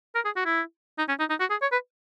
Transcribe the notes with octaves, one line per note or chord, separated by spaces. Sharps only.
A#4
G#4
F#4
E4
D#4
C#4
D#4
D#4
F#4
G#4
C#5
B4